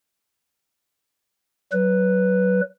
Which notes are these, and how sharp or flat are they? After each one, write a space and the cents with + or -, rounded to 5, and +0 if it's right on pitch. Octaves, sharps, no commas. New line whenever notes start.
F#3 +25 B4 +0